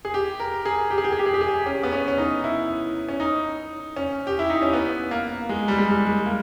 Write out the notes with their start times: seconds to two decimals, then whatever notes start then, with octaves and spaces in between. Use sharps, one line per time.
0.05 G#4
0.14 G4
0.40 A#4
0.65 G#4
0.90 G4
0.98 G#4
1.04 G4
1.12 G#4
1.19 G4
1.26 G#4
1.34 G4
1.41 G#4
1.48 G4
1.66 C#4
1.83 B3
1.93 C#4
2.08 C#4
2.18 D#4
2.44 E4
3.09 C#4
3.20 D#4
3.96 C#4
4.27 G4
4.39 E4
4.50 D#4
4.62 C#4
4.73 B3
5.11 A#3
5.49 G#3
5.68 G3
5.78 G#3
5.88 G3
6.07 G#3
6.26 A#3